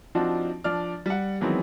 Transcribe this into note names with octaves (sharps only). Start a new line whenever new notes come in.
F3 C4 D4 D#4 F4 F#4
F3 D4 D5 F6
G3 F#5
D#3 E3 F#3 G#3 B3 C4